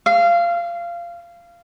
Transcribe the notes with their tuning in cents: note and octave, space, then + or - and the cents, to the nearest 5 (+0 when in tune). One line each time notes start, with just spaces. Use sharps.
F5 -20